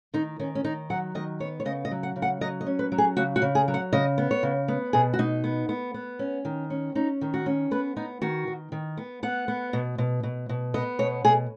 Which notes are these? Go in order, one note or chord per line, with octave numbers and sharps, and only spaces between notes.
D#3 D#4
D#3 C#4
C#4
D#3 D#4
F#3 F#5
D#3 D#5
B3 C#5
C#5
C#3 D#5
D#5
F#3
F#5
C#3
F#5
F#3 D#5
D#5
C#4
B4
F#3
G#4
C#3 F#4
F#4
C#3
G#4
F#3
F#5
C#3 D#5
B3
C#5
C#3
B3
B2 G#4
F#4
B2 D#4
B3
B3
B3
C#4
D#3
C#4
C#4 D#4
D#3
F#4
C#4
B3 B4
B3 D#4
D#3 F#4
D#3
D#3
B3
B3 F#5
B3
B2
B2
B2
B2
B3 D#5
B2 C#5
B2 G#4